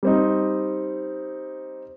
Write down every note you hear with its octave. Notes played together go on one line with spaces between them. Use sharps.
G3 C4 D#4